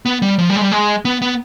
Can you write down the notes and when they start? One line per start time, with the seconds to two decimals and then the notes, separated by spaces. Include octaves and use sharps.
0.06 B3
0.22 G3
0.39 F3
0.50 G3
0.56 G#3
0.61 G3
0.72 G#3
1.05 B3
1.22 B3